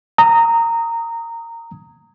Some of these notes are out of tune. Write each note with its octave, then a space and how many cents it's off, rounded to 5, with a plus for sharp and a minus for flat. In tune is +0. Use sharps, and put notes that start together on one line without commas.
A#5 -15 D#6 +15